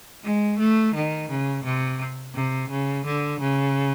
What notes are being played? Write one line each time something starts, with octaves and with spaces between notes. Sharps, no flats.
G#3
A3
D#3
C#3
C3
C3
C#3
D3
C#3